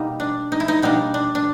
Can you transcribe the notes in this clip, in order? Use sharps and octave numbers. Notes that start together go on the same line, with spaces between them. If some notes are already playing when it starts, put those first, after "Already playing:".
Already playing: B2 G3 A#3 D#4
D4
D#4
E4
D#4
B2 G3 A#3 D4 D#4
D4
D4